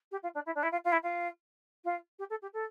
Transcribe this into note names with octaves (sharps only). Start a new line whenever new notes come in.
G4
F4
D4
E4
D4
E4
F4
F4
E4
F4
F4
G4
A4
G4
A4